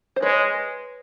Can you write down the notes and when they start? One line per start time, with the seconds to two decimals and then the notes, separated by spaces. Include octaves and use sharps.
0.16 C5
0.22 G#3 B4 C#5